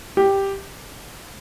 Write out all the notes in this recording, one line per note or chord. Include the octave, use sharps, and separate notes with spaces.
G4